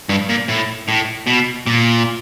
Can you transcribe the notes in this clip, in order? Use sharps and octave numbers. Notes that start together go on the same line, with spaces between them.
G2
A#2
A2
A2
B2
A#2